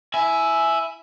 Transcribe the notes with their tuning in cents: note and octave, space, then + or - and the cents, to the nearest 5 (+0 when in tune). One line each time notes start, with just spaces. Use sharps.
E4 +0 G#5 +15